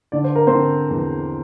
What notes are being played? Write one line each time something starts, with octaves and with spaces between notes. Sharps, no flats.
D3 D5
C5
A#4
D3 C4 C5
E2